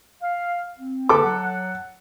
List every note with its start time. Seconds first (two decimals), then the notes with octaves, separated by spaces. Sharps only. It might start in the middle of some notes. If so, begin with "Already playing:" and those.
0.22 F5
0.79 C4
1.09 D3 A#3 A4 B4 D6
1.24 F#3 F#5